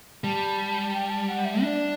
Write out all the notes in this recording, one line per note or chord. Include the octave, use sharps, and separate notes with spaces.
G3 A5
G5
A5
F#5
E5
D4 D5 E5